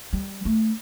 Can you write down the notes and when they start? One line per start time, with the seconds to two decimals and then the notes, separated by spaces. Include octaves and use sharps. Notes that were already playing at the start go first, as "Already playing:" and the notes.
0.13 G3
0.45 A3